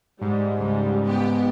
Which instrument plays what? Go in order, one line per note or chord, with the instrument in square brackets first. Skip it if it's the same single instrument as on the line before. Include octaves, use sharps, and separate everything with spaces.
[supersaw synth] G#2 [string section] G3
[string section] C#2 G3
B3 G4